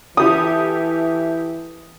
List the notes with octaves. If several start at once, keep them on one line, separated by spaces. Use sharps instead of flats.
E3 E4 G4 A4 D#6